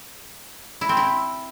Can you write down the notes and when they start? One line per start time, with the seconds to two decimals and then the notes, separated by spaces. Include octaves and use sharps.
0.81 E4
0.89 C4
0.97 E4